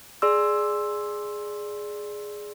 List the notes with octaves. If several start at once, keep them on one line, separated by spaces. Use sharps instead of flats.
G#4 D5 C6 E6